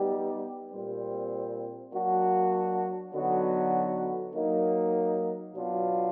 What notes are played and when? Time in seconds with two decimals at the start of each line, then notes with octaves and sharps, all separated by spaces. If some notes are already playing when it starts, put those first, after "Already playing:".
Already playing: G3 B3 D#4 G4
0.72 A#2 G3 C4
1.93 F#3 A#3 D4 F#4
3.14 D3 F#3 B3 D#4 F#4
4.34 F#3 A#3 D#4
5.55 B2 F#3 B3 D4 F4